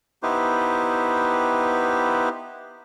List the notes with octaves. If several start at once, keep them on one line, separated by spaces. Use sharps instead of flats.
B3 D#4 E4 G4 B4 C5